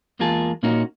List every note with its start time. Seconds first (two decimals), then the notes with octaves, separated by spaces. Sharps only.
0.19 E2 G#3 A#3 F4 G#4 A5
0.63 A#2 A#3 C#4 D#4 F#4